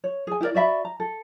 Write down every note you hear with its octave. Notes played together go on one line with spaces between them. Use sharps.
C#5
G#4 G#5
E4 G4 A#4 D5
F#4 D5 E5 B5
A#5
A4